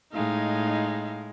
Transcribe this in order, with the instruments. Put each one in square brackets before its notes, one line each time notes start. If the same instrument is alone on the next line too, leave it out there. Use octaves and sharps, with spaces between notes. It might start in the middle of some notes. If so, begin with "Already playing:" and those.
[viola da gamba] A2 G#3 [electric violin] D#4 F5